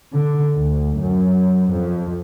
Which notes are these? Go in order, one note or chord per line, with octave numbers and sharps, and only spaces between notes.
D3
D2
F#2
F2